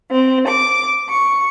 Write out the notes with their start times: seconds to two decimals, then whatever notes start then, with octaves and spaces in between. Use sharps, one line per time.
0.11 C4
0.47 D6
1.08 C#6